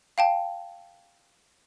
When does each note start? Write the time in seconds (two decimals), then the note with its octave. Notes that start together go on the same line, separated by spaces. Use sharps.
0.18 F5 G5 A5